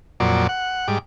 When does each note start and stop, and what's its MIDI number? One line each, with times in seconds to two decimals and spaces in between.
0.20 0.47 41
0.20 0.47 46
0.20 0.47 54
0.20 0.47 74
0.49 0.88 78
0.88 0.98 44
0.88 0.98 55
0.88 0.98 86